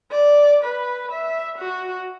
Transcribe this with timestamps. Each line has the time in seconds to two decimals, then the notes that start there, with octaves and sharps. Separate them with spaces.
0.12 D5
0.64 B4
1.12 E5
1.58 F#4